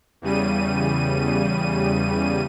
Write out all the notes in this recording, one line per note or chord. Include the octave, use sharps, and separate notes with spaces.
E2 C#3 G3 D#7